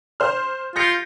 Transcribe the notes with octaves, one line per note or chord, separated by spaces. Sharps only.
C5 F6
F4 G6 A#6 C#7